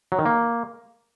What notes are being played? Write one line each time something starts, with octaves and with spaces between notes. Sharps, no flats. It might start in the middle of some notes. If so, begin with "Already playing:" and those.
F#3
D#3
A#3